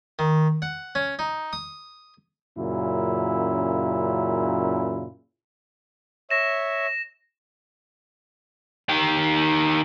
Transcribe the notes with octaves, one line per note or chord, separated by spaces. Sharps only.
D#3
F#5
C#4
D#4
D#6
F#2 A#2 C#3 E4
C#5 E5 A#6 E7
D#3 G4